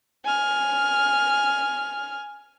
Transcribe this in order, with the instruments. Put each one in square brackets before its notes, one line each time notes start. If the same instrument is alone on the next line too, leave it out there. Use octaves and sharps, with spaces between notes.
[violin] G#5 F6